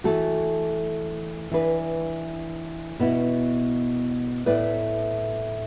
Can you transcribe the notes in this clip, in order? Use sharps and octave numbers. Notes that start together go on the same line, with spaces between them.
E3 A3 F#4 A4
E3 D4 B4
B2 B3 E4
A2 A3 E4 B4 D5